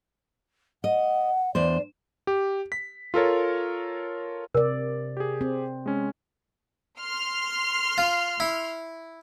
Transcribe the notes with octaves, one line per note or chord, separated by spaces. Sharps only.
D#5 F#5
E2 D4 C5 D5
G4
B6
F4 A4 A#4 C#5
C3 A#4 D5
G4 G#4
C4
G#3 C#4
C6 F6
F4
E4